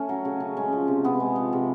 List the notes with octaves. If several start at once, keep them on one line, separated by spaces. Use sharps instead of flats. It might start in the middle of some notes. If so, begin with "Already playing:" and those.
Already playing: A3 C#4
F#3
C#3
C#3
G#3 C#4
F3
C3
C3 B3
G#3
F3
C3